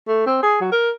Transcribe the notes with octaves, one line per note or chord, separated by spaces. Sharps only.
A3
C4
G#4
F#3
A#4